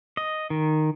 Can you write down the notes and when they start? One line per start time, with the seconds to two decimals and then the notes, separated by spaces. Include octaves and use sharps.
0.17 D#5
0.50 D#3